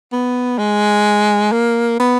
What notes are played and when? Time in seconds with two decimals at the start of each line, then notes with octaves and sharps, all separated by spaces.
0.12 B3
0.58 G#3
1.52 A#3
2.00 B3